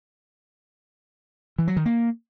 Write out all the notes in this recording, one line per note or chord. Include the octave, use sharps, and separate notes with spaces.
E3
F#3
D#3
A#3